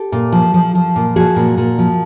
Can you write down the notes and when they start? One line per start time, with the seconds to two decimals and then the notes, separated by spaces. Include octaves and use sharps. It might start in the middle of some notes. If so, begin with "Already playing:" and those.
Already playing: G4 A4
0.12 A#2
0.32 F3
0.54 F3
0.75 F3
0.96 A#2
1.16 F3 F#4 G#4
1.36 A#2
1.57 A#2
1.78 F3